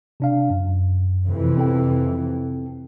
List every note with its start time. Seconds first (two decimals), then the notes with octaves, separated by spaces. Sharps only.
0.20 C3 D4 F5
0.50 F#2
1.26 F2 C3 E3
1.57 C4 A4 G5